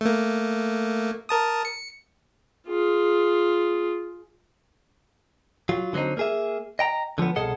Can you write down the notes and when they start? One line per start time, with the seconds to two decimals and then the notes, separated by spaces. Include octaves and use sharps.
0.01 A3 A#3
1.29 A#4 A5 D#6
1.65 C#7
2.68 F4 G#4
5.69 F#3 F4
5.93 D3 F#3 G#3 C4 D#4
6.17 A#3 G#4 E5
6.79 D#5 G5 A#5
7.18 D3 F3 F#3 B3
7.36 C2 B2 G#4 A4 D#5 F#5